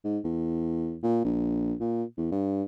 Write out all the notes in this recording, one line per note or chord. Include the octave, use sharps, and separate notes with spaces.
G#2
E2
A#2
A#1
A#2
E2
G2